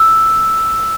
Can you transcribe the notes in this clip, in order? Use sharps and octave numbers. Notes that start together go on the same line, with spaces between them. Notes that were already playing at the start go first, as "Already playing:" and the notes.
Already playing: E6